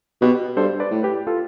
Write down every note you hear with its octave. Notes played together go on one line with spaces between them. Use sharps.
B2 G4 B4
G2 A4 C5
B4 D5
A2
G4 B4
F4 A4